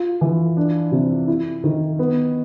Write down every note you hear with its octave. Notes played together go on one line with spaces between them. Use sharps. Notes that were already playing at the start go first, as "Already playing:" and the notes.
Already playing: F4
E3
D4
C3
E4
D#3
B3